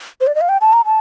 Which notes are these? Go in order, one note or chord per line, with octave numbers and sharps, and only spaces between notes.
C5
D5
D#5
F5
G5
A5
A#5
A5